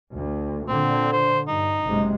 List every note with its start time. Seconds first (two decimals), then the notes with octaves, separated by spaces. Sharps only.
0.12 D2
0.68 A#2 D3 C4
1.12 C5
1.48 G2 D#4
1.85 F#1 C3 G#3